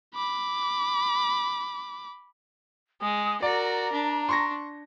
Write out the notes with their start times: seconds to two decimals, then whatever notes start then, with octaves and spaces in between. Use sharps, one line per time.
0.15 B5 D6
3.01 G#3 D#6
3.42 F#4 A#4 D5 A#5
3.92 D4
4.29 C6 C#6 A#6